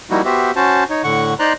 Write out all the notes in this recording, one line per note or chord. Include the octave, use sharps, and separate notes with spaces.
F3 G3 A#3 D#4 E4 F#4
B3 F#4 G4 C5 E5
C#4 F#4 C5 A5
D#4 C#5
A2 D3 F#5 C#6
D#4 C5 D5 A#5 C6 F#6